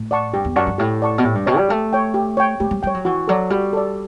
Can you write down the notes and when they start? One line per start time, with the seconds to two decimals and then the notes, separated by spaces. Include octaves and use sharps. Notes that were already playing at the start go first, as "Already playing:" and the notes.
Already playing: A2
0.11 D5 F#5 A5 C#6
0.33 G2 G4
0.45 E2
0.56 F#2 D5 F#5 A5 C#6
0.67 G2
0.78 A2 G4
1.02 D5 F#5 A5 C#6
1.18 B2
1.24 A2 G4
1.35 G2
1.47 B2 C#5 G5
1.57 G3
1.69 A3 G4
1.93 C#5 G5
2.14 G4
2.37 C#5 G5
2.60 A3 G4
2.71 G3
2.83 G3 C#5 G5
2.94 F#3
3.05 E3 F#4
3.28 F#3 A4 D5
3.50 G3 F#4
3.73 A4 D5